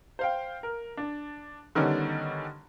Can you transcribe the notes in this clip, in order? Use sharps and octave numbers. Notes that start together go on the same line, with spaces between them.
C5 F5 G5
A#4
D4
D3 D#3 G3 B3 C#4 D4